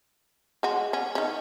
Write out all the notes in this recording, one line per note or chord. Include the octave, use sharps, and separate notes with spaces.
G#3 F#4
C#4
D#3 C#4